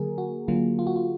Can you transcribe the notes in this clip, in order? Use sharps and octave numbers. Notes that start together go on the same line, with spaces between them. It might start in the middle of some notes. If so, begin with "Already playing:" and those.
Already playing: D3 F#3 A#3 G#4 A#4
F#4
D3 F#3 A#3 F4
F4
F#4
F4